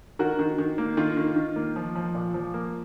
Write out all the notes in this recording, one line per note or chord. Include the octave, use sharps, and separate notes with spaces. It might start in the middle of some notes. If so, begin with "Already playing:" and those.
D#3 F#4 A#4
D#3
D#3
A#3
D#3 F4
D#3
D#3
A#3
F3
F3
A#2
F3
A#3